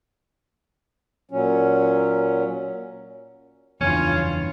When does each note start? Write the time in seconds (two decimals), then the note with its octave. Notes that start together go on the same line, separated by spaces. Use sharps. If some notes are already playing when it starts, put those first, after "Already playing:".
1.31 A#2 F#3 C#4
3.81 F#1 E2 G2 C#4 F4